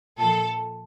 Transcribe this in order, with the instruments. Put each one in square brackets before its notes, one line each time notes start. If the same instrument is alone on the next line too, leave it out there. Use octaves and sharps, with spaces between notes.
[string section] A#2 F3 A4